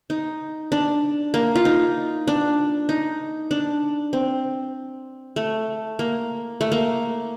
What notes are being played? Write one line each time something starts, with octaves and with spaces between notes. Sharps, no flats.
D#4
D4
A#3
F4
D#4
D4
D#4
D4
C4
A3
A#3
A3
A#3